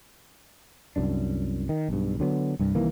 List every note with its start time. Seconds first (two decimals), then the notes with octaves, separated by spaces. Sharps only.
0.96 C2 F#2 D4
1.69 D#3
1.89 B1 G2
2.20 D3 F#3 B3
2.59 C2 G2
2.75 C2 D#3 E3 A#3